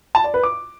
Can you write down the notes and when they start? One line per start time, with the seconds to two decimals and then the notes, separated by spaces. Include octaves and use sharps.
0.15 A5
0.24 D5
0.34 B4
0.43 D6